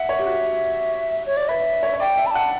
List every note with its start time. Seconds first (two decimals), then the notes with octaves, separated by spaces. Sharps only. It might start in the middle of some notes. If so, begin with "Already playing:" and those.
Already playing: E5 F#5
0.09 C#5
0.19 G4
0.27 F#4
1.26 C#5
1.37 D5
1.48 B4 E5
1.83 C#5
1.94 C#5
2.00 D5 G5
2.18 E5
2.26 B5
2.30 F#5 A5